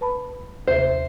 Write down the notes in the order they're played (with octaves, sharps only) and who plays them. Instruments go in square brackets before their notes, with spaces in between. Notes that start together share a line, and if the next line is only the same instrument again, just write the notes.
[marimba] B4 A5 B5
[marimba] D#2 C3 E5 [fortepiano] C5